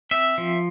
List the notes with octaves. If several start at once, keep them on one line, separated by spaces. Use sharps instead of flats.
C4 E5
F3